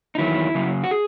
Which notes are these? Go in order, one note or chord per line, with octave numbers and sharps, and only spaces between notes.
D#4
E2 D#3 F#3 E4
F#2 C#3 F#3
F#4
G#4